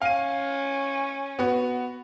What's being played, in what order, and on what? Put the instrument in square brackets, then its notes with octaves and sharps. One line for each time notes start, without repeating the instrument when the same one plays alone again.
[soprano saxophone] C#4 [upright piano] F5 D#7
[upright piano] B3 F#4